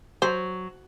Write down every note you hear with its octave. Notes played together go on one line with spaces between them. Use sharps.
F#3 C5